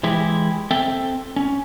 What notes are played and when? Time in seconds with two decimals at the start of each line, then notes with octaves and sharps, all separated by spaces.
0.03 E3 G#3 E4 G4
0.71 C4 A4 E5 G5
1.36 C#4